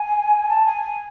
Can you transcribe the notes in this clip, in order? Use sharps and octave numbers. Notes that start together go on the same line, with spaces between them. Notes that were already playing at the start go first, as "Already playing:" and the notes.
Already playing: G#5
A5
G#5
G#5